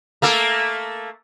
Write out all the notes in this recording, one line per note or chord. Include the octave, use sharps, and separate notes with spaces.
A3 A#3 A4